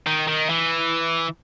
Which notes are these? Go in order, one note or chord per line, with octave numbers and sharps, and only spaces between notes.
D#3
D#3
E3